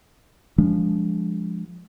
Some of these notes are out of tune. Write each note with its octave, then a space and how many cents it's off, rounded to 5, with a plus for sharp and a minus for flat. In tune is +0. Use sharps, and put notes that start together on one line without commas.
F3 +0 G#3 -15 D4 -25